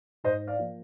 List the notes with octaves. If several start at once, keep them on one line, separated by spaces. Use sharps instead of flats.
G#2 C5 D#5
D5 F5
F3 A#3